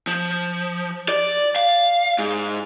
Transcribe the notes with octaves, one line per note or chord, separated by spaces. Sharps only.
F3
D5
F5
G#2